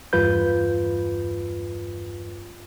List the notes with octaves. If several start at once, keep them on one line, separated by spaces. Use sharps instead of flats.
E2 G2 F4 B4 G6